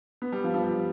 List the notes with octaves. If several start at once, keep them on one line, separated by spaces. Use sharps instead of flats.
B3
G3
F3
F3
G3